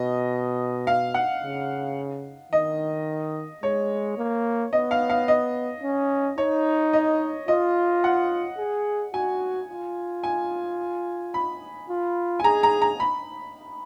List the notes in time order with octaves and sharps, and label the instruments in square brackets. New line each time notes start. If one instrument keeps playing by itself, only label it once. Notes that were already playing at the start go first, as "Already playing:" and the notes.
Already playing: [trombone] B2 [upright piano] D#5
[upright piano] F5
F#5
[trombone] C#3
[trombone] D#3 [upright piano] D#5
[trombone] G#3 [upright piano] C#5
[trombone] A#3
[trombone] B3 [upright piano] D#5
[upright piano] F5
F5
D#5
[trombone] C#4
[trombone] D#4 [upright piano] C#5
[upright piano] D#5
[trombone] F4 [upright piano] D#5
[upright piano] F#5
[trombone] G#4
[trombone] F#4 [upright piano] G#5
[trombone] F4
[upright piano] G#5
B5
[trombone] F4
[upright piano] G#5
[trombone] G#4 [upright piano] A#5
[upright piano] A#5
A#5
B5